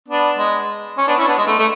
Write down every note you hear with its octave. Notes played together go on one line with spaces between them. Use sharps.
B3 D4
G#3
C#4
B3 D4
C#4 E4
B3 D4
G#3
A3
A3